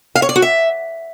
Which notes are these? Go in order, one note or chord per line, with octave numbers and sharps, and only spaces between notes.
F5
C#5
D5
F#4
E5